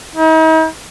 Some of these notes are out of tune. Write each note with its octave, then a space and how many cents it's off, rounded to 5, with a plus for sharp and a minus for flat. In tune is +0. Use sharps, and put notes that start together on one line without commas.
D#4 +45